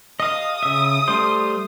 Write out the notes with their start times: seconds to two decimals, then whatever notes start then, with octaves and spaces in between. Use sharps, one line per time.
0.20 D#5 F5 D#6
0.63 C#3 E5
1.08 G3 A3 C5